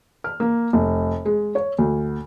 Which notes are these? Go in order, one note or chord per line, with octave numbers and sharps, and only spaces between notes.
F6
A#3
F1
G#3
C#5
D2